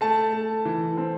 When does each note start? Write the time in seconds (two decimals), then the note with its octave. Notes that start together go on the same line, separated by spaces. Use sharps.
0.01 A3 A5
0.33 A3
0.65 E3
0.98 C4